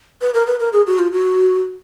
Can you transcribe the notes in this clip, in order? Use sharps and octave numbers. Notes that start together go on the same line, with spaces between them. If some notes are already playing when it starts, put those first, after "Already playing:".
B4
A#4
B4
A#4
G#4
F#4
F4
F#4